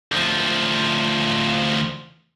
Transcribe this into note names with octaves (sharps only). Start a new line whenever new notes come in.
D2 F3